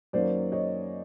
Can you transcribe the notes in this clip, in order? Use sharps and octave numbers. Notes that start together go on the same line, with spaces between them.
F#2 D#3 F#3 A#3 C5 D5
C#5 D#5